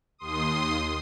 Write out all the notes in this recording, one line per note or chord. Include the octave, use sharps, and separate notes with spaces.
D#2 C6 D#6